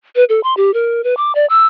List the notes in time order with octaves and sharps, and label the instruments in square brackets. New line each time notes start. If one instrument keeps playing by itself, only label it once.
[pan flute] B4
A4
C6
G4
A#4
B4
D6
D5
E6